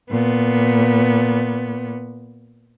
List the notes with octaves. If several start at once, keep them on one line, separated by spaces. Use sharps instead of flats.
A#2 B3